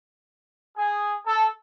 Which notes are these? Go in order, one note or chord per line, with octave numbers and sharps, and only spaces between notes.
G#4
A4